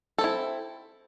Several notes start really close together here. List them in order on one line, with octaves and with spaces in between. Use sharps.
A4 C4 E4